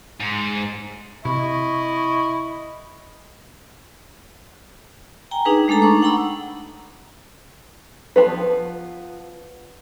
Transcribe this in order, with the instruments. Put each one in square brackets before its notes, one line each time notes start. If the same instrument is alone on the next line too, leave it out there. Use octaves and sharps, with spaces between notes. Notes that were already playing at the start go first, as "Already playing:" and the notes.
[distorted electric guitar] G#2
[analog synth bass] C3 [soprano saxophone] E4 [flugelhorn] D#5 [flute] C#6
[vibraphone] G5 G#5 A#5
D4 D#4 G#4 B4
G#3 A3 D4 A4 A#5
D#4 C#6 D6
F#5 G5 A#5 B5 E6
[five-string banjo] F3 G#3 B3 B4